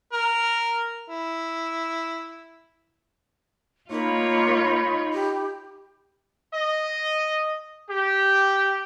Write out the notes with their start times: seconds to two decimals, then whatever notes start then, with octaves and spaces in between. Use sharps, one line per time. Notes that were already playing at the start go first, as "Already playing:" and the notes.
0.13 A#4
1.09 E4
3.90 A#3 D#4 F4 C#5 B5
5.13 G4
6.54 D#5
7.89 G4